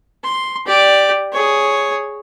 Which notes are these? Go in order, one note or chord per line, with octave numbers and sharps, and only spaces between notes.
C6
G4 D5
G#4 C#5